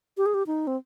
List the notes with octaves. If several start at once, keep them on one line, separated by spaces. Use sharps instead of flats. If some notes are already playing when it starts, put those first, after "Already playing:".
G4
G#4
G4
D#4
C4